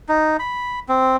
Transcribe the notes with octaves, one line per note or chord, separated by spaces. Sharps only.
D#4
B5
C4